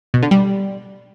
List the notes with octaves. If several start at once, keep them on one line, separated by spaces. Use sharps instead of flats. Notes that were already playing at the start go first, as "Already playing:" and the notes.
B2
D3
G3